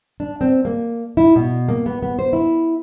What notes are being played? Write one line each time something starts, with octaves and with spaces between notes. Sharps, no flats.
D4
C4
A#3
E4
B2
A#3
B3
B3
C5
E4